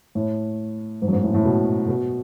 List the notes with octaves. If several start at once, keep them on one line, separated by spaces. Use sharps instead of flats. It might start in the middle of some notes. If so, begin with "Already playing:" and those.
A2
G#2
F#2
G#2
A2
A2
B2
B2